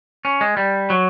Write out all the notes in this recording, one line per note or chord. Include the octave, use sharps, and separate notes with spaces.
C#4
G#3
G3
F#3